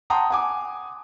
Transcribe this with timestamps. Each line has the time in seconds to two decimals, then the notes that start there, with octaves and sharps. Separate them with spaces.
0.10 F#5 G5 A5 A#5 C6 D#6
0.30 F#5 G#5 D6